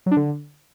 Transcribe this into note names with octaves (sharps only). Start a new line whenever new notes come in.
F#3
D4
D3